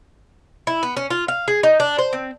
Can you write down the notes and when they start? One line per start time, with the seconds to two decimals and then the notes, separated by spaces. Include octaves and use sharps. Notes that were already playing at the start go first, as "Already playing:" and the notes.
0.67 E4
0.83 B3
0.97 C#4
1.11 F4
1.28 F5
1.48 G#4
1.63 D#4
1.80 D4
1.99 C5
2.13 C4